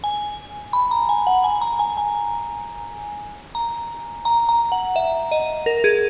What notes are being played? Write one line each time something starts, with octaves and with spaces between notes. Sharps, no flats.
G#5
B5
A#5
G#5
F#5
G#5
A#5
G#5
G#5
A#5
A#5
A#5
F#5
E5
D#5
A#4
G#4